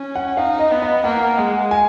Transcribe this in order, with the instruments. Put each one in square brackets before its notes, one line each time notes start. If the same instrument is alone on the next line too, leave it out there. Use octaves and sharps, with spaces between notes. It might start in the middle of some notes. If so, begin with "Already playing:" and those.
Already playing: [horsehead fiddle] C#4
[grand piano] F#5
[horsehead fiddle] D#4 [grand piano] F5
[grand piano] D#5
[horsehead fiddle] B3
[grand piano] D#5
[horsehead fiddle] A#3 [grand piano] F#5
[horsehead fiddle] G#3 [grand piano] F#5
[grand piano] G#5